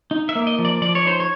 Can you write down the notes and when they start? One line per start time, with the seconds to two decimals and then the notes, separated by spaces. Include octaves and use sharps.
0.11 D#4
0.29 E5
0.35 A#3
0.47 D#5
0.59 F3
0.65 D5
0.82 F3 D5
0.95 C#5
1.05 D#4 C5
1.20 C#5